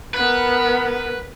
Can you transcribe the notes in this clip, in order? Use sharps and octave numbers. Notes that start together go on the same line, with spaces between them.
B3 A#4 B4